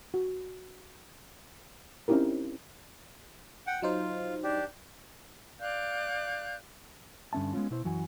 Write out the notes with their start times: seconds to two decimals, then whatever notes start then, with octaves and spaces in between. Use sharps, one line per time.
0.14 F#4
2.08 C4 C#4 D#4 E4 G4 A#4
3.67 F#5 G5
3.82 F#3 D#4 F4 C5
4.44 D4 G4
5.60 D5 F5 F#6 G6
7.33 G2 D3 C#4 E5 A5
7.53 G#3 B3 C#4 F4
7.70 B2 E4 C5
7.84 F#2 E3 F#4 G#5